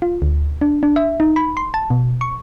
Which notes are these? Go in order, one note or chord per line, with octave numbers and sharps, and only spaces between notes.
F4
D2
D4
D4
E5
D#4
B5
C6
A5
B2
C#6